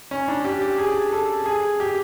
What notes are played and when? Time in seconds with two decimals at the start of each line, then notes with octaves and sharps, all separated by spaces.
0.11 C#4
0.28 D4
0.45 G4
0.62 G4
0.78 G#4
1.12 A4
1.46 G#4
1.80 G4